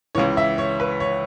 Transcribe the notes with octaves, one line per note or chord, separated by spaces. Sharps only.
C#2 C#3 E3 C#5
E5
C#5
B4
C#5